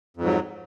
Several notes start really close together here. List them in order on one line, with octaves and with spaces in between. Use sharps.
F2 G#2 F#3